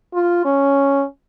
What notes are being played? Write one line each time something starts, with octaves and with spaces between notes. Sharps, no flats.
F4
C#4